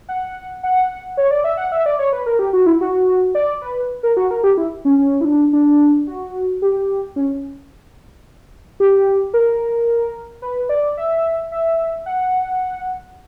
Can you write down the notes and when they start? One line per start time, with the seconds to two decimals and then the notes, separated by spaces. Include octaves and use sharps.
0.09 F#5
0.63 F#5
1.17 C#5
1.31 D5
1.44 E5
1.57 F#5
1.72 E5
1.86 D5
1.99 C#5
2.13 B4
2.26 A#4
2.39 G4
2.53 F#4
2.66 E4
2.81 F#4
3.35 D5
3.62 B4
4.03 A#4
4.17 F#4
4.31 A#4
4.44 G4
4.58 E4
4.85 C#4
4.98 C#4
5.21 E4
5.25 D4
5.53 D4
6.07 F#4
6.62 G4
7.16 C#4
8.80 G4
9.34 A#4
10.42 B4
10.69 D5
10.97 E5
11.52 E5
12.06 F#5